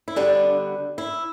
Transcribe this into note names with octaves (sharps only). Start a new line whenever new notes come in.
E4
D3 G3 B3 D4
E4